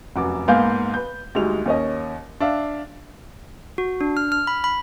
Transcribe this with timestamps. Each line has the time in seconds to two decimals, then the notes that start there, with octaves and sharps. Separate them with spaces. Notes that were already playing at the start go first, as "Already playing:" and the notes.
0.16 F1 F#2 F#4 D6
0.48 G#2 A#3 B3 F5 G#5 G6
0.94 B4 G6
1.35 D2 G3 G#3 D#4 F7
1.66 D#2 C#4 D#5
2.40 D4 E5 F5
3.78 F#4
4.01 D4
4.17 F6
4.32 F6
4.47 B5
4.64 B5